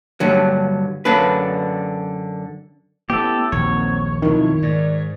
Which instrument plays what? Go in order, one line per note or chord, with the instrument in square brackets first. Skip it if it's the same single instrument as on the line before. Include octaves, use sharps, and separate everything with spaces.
[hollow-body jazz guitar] G2 D3 F#3
F#2 D3 D4 B4
[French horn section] A3 C#4 E4 [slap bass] B3 [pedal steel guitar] G4 A4
[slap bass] A#1 D#2 [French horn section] F#3 C4 [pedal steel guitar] C#5
[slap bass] B1 F2 [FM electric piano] D#3 [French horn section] E4
[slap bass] G#2 [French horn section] D5